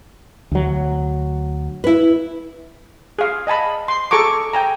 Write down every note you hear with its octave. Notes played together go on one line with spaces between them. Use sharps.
D2 F#3
E4 B4
G#4 F5
D#5 G#5 A5 B5
C6
G#4 A4 A#5 C#6 D6
G5 G#5 A#5